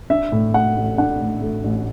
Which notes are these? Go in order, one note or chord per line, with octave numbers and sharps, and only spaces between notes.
D4 E5
A2
A3 F#5
A1
D4 F#5
A2
A3
A1